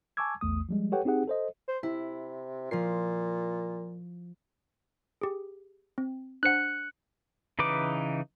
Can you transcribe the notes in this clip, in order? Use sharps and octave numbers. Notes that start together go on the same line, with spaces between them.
G#5 A5 C#6 D6 E6 G#6
A#1 E2 A3 D#6
F3 G3 G#3
G4 A4 B4 C#5 F#5 G5
C4 D#4 G4 G#4 F#5
A4 C5 D#5
C5
C3 E4
A#2 F3 C7
G4 G#4
C4
D4 C5 F#5 F#6 C#7
C#3 E3 D#4 B4 D6